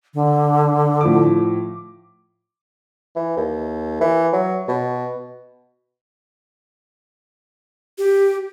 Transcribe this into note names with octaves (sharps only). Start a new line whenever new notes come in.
D3
A2 F3 D6
E3
D#2
E3
F#3
B2
G4